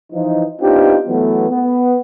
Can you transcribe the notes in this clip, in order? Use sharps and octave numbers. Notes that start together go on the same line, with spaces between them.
E3 F3 D#4
B3 C4 D4 D#4 F4 G4
E3 F#3 A3 B3
B3